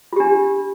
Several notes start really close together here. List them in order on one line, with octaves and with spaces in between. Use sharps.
F4 G4 D4